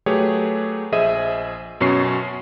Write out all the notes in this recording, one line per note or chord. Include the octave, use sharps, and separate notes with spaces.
F#3 A3 G4 G#4 B4 C#5
A#1 G#4 C5 D#5 E5 D#7
F#2 B2 C#4 C#6 C7